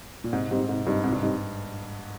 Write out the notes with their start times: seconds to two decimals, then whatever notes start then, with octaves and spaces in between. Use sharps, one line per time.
0.24 A#2
0.33 G#2 C3
0.51 G#2 G3 C4 D#4
0.69 G#2 C3
0.86 G2 G3 C4 D#4
1.04 G#2 C3
1.13 G2
1.22 G3 C4 D#4